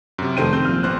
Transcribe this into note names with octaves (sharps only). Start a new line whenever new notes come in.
F#2 C3
F1 D#3 A4 C5 G5 D#7
C4 G6
A#1 F6
G#1 B3 C5 F#6